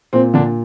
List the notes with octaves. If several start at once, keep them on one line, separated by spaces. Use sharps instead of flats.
A#2 C4
A#2 D3 D4